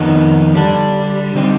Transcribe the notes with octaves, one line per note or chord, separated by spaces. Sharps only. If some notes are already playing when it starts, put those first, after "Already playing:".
Already playing: F2 D#3 B3 D#4
D3 G3 D4
D3 G3 C4 D#4 G4